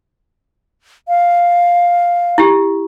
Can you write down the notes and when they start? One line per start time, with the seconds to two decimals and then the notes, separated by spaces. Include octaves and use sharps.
1.08 F5
2.38 E4 G4